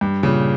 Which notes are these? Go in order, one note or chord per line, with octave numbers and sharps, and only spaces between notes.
G2
A#2 C#3